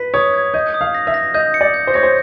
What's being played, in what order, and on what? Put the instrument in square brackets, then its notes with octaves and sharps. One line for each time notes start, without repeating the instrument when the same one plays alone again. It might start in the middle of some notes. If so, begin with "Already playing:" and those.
Already playing: [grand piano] B4 [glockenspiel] B6
[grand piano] C#5 [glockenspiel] D#6
[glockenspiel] G#6
[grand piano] D#5 [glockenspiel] G6
[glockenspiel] D#6
[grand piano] F5
[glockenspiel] A#6
[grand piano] E5
[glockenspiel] A#6
[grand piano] D#5 [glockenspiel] G6
[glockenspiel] C#7
[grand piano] D5
[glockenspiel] G6
[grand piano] C5
[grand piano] C#5 [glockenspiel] A#6
[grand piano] C5